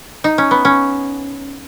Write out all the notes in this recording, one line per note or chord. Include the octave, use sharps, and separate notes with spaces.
D#4
C#4
B3
C#4